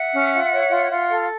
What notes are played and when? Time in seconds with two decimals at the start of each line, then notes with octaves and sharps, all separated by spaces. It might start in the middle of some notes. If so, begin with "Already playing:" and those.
Already playing: E5 F#5
0.12 C#4
0.32 F4
0.52 C#5
0.70 F4
0.90 F4
1.09 A4